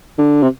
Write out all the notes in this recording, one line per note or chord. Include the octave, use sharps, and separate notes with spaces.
D3
C3